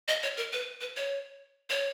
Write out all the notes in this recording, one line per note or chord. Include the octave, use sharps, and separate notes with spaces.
D#5
C#5
A#4
B4
B4
C#5
C#5